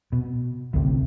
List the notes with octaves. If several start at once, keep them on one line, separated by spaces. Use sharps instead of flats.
B2
A1 D2 A2 C3